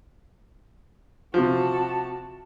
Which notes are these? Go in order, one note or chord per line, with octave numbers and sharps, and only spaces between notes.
C3 F3 F#4 A5